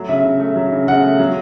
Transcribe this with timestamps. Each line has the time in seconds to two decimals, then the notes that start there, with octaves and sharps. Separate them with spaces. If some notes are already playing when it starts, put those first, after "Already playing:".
Already playing: F#3 A3
0.09 C#3 E5
0.24 C#3
0.40 A3
0.56 F#3
0.72 C#3
0.87 C#3 F#5
1.04 A3
1.19 F#3